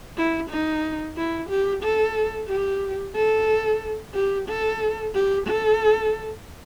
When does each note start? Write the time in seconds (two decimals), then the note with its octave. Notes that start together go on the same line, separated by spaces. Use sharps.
0.17 E4
0.50 D#4
1.17 E4
1.50 G4
1.83 A4
2.48 G4
3.15 A4
4.14 G4
4.48 A4
5.15 G4
5.47 A4